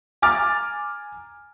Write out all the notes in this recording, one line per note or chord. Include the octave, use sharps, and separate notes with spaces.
G#5 A#5 D6 F6 A6